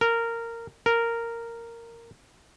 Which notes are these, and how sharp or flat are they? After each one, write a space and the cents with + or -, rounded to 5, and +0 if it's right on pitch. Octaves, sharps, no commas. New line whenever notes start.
A#4 -15
A#4 -10